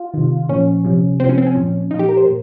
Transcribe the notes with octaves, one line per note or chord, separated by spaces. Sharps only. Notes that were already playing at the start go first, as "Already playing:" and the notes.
Already playing: F4
C3 D#3
A#2 F3 C#4
C3 F3
C3 F3 C4
C#4
C4
C#4
A#2 F3
A#2 F3 D#4
G4
A#4
C5
A#2